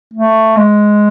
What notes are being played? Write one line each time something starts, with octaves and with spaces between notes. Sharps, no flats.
A3
G#3